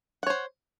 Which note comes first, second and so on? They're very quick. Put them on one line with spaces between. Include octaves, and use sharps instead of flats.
F#5 C#5 C5